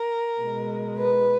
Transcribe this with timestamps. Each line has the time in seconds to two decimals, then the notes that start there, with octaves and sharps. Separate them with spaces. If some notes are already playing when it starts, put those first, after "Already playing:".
Already playing: A#4
0.41 B2 G#3
0.96 B4